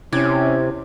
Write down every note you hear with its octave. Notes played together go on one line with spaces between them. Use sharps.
C3 C#4 E4 D6 G#6